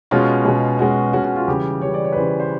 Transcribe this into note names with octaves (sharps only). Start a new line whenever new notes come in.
B2 G#3 C#4 F4
B2 G#3 C#4
B2 G#3 C#4 F#4
B2 G#3 C#4 F#4
F#4
F4
C#3 E3 G3 G4
C#3 E3 G3 C#5
D5
C#5
B4
C#3 E3 G3 C5
C5